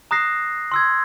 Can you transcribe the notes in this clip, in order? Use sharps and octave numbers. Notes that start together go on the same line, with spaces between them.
A#5 D#6 F#6 A#6 C7
C6 E6 G#6